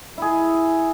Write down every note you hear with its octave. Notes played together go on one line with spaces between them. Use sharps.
E4 G#4